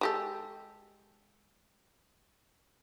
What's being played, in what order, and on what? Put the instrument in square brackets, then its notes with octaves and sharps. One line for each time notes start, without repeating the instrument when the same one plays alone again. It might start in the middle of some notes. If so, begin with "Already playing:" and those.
[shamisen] G#3 G4 A4